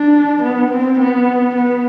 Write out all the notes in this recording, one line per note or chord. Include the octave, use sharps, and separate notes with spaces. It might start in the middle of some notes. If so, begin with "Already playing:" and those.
Already playing: D4
B3
C4
B3
B3